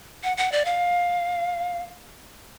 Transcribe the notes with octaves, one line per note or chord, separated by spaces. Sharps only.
F#5
F#5
D5
F5